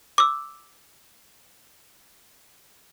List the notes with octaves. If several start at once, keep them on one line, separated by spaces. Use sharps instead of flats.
D6 E6